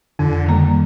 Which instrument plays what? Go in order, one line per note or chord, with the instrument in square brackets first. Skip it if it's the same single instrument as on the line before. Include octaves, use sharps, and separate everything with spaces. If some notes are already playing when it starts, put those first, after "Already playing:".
[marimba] F2 [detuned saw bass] D3
[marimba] D#3 G3 A#3